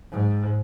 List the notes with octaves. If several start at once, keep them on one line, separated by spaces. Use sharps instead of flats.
G#2